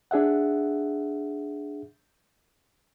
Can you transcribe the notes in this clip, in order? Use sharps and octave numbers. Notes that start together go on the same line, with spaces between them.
D4 G#4 E5 F#5